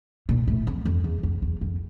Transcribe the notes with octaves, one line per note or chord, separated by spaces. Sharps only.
A#2
A2
F2
F2
E2
F2
E2
F2